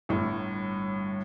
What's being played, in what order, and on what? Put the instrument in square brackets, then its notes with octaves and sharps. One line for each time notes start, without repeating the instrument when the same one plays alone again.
[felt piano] G1 A2